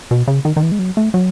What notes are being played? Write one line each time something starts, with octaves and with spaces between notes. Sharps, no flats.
B2
C#3
D#3
D#3
E3
G#3
F#3
A3
F#3